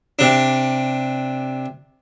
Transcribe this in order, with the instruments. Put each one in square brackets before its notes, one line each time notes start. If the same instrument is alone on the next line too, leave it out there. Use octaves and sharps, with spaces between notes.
[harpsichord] C3 D4